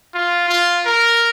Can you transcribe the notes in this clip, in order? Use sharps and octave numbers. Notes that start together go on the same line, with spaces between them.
F4
F4
A#4